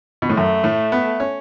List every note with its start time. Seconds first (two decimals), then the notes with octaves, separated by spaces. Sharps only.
0.22 B2
0.30 A2
0.36 F#2 A3
0.64 A2
0.92 B3
1.20 C#4